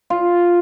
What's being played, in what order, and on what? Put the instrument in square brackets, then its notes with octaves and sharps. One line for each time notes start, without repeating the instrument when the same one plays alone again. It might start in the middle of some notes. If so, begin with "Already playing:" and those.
[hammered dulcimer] F4